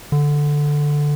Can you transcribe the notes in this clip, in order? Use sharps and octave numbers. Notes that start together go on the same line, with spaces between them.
D3